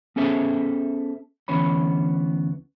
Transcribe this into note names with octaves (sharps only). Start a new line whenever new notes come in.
B3 C#4 G#4 A4 C5 E5
D2 E3 B3 C#4 C#5 B5